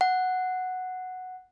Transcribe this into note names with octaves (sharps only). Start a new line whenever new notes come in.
F#5